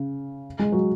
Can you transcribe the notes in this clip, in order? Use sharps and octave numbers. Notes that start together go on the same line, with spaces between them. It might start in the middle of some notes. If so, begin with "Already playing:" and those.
Already playing: C#3
G#3
F#3